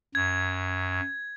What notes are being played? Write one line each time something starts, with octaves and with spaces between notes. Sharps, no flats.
F#2 G#6